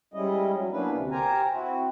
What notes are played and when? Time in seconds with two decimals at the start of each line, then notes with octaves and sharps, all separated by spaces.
0.14 G3 G#3 C#4 E4 D#5
0.54 F#3
0.72 A#3 B3 C#4 D4 E4 B4
0.93 D2 C3
1.11 G4 A#4 C5 G#5 A#5
1.53 C4 E4 F#4